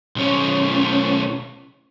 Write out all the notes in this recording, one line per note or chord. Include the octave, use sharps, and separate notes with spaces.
B1 C#4